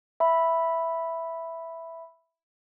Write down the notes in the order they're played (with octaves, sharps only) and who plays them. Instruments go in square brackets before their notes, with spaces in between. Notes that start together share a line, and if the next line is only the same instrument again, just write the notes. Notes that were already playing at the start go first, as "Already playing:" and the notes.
[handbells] E5 B5